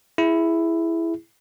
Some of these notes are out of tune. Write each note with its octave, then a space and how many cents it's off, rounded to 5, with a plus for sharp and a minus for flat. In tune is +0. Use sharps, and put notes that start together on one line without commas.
E4 +5 G#4 +0